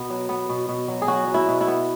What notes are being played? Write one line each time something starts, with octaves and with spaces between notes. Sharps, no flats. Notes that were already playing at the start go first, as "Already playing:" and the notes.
Already playing: B2 B3
F#3
B3
B2
B2
F#3
G#4
F#3 F#4
F#3
E4
B2
E4
B3